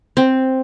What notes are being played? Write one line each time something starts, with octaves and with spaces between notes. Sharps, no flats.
C4